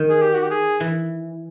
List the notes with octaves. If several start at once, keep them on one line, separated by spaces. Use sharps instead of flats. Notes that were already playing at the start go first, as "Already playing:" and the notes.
Already playing: D#3
G#4
G4
F#4
G4
G#4
E3